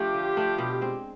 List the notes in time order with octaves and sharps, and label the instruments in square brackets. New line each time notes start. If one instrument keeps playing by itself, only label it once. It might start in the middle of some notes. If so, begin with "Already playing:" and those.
Already playing: [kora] F3 A3 D4 [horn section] F4 G4
[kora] D3
F3 A3 D4
B2
G#3 C4